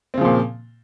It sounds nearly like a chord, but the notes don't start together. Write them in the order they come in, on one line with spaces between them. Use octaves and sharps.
C4 C#3 F3 A#2